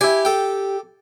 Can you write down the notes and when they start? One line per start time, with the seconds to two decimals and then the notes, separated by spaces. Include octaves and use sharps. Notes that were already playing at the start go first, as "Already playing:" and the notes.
0.01 E4 G4 G#5
0.25 A4 G5